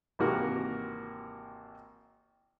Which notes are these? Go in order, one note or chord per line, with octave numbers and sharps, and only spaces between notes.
G#1 C3 E3 A#3 F#4 A#4